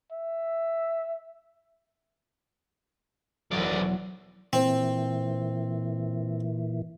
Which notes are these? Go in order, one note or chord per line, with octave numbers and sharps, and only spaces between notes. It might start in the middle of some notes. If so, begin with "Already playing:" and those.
E5
E1 B1 F#3 D5
A#2 E3 C4